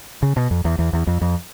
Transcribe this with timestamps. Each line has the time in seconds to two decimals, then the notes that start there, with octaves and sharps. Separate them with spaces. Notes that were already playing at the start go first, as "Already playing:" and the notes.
0.22 C#3
0.37 B2
0.51 F2
0.65 E2
0.79 E2
0.93 E2
1.07 F2
1.21 F2